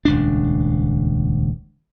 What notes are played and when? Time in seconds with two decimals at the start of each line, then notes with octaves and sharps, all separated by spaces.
0.05 D#1 C#2 D4